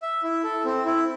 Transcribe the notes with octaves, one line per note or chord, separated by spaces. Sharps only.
E5
E4
A4
C4
E4